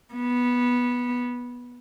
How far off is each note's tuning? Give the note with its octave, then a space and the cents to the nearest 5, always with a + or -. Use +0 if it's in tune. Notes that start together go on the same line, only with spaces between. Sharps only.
B3 -10